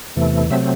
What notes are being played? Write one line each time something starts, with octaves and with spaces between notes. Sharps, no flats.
E2 C3 E3 A3
C3 F#3 A3 C4 E5